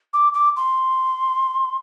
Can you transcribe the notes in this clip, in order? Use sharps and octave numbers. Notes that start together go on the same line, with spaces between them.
D6
D6
C6